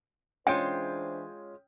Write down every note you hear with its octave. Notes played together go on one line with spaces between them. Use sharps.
E3 G#3 C#4 D4 F4 C5 G5 G6